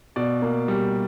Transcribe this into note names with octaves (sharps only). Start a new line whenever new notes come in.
B2 D5
A#3
G3